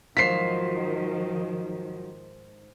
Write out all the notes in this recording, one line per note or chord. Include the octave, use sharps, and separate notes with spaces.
G#2 D#3 F3 F#3 C5 F5 B6 C7